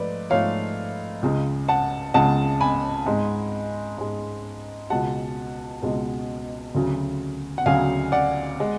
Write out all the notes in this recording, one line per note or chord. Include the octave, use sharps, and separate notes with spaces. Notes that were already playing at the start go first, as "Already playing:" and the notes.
Already playing: G#2 F3 A3 B4 D5
G#2 F3 A3 C#5 F5
C#2 C#3 G#3
F#5 A5
C#2 C#3 G#3 F#5 A5
G#5 B5
G#2 G#3
G#2 G#3
C#2 B2 G#3 F#5 A5
C#2 B2 G#3
D2 C#3 F#3
F#5
D2 C#3 F#3 F5 G#5
D5 F#5
G#3